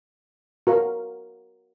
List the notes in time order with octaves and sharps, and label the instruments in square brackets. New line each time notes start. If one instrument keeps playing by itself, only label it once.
[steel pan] F#4 A#4 F5